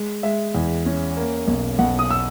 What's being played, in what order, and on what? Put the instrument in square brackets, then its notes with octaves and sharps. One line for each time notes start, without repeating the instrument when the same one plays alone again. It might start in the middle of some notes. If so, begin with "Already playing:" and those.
Already playing: [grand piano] G#3
G#3 E5
E2
C#4
A#3
B1
B1 F#5
D#6
E6